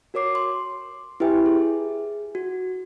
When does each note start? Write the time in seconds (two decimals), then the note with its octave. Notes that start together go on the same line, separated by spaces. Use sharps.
0.14 F#4 A#4 C#5 D6 C7
0.35 C6
1.20 E4 G4 B4 E5 G5 G#5
1.46 G#4
2.35 F#4